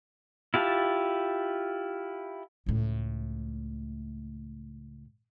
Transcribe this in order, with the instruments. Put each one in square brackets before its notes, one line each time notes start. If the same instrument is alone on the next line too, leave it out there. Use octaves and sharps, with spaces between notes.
[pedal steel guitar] E4 F4 G4 A5
[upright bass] C#2 A2